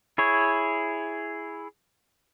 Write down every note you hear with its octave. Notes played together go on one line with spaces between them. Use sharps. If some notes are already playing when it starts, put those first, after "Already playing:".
E4 G#4 C#5